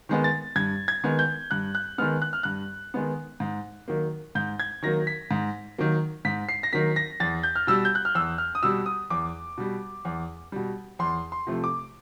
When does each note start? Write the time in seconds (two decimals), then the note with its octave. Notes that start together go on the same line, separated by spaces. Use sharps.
0.09 D#3 G#3 B3
0.24 A6
0.56 G2 G#6
0.88 G#6
1.04 D#3 G#3 B3
1.19 G6
1.51 G2 F#6
1.75 F#6
1.98 D#3 G#3 B3 F6
2.22 F#6
2.33 F6
2.43 G2 F#6
2.94 D#3 G#3 B3
3.40 G#2
3.88 D#3 F#3 A#3
4.35 G#2 G6
4.60 G#6
4.83 D#3 F#3 A#3 A#6
5.07 B6
5.31 G#2
5.78 D#3 F#3 A#3
6.25 G#2 B6
6.49 C7
6.63 A#6
6.73 D#3 F#3 A#3 B6
6.96 A#6
7.20 E2 A6
7.43 G6
7.56 F6
7.67 B2 G3 E6
7.85 G6
7.95 F#6
8.05 F6
8.15 E2 E6
8.38 F6
8.55 D#6
8.63 B2 G3 E6
8.86 D#6
9.10 E2 D6
9.58 B2 G3
10.05 E2
10.52 B2 G3
10.99 E2 C6
11.32 C6
11.47 C3 F3 A3
11.64 D6